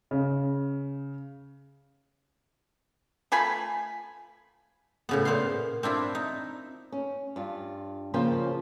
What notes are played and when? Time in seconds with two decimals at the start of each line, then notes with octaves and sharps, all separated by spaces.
0.11 C#3
3.32 A3 F4 G#5 B5
5.09 A2 C#3 B3
5.25 A#2 C5 F5 C6
5.83 C4 D4 E4 F4
6.15 D#4
6.92 C#4
7.36 G2 F4
8.14 C#3 F3 A#3 C5 G5